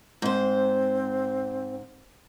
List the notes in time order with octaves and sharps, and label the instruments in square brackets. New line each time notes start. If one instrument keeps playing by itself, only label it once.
[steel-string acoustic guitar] G#2 C5 [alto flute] C4